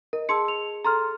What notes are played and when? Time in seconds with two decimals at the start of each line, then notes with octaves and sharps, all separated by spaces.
0.13 A#4 D#5
0.29 G#4 A5 C6 E6 C#7
0.48 F7
0.85 A4 A#5 C6 F6